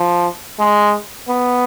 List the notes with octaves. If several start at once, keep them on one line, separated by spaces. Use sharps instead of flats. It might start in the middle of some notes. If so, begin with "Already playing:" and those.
Already playing: F3
G#3
B3